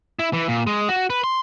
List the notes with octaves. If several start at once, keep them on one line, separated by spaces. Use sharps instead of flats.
E4
E3
A#2
G#3
F#4
B4
C6